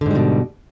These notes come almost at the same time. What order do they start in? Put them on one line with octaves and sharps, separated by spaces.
D3 G#2 G3 B2